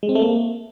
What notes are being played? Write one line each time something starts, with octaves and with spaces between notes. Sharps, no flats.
G#3
C4
A3
A#3